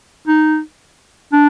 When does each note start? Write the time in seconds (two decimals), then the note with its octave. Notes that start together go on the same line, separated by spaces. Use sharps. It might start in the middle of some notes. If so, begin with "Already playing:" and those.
0.28 D#4
1.32 D4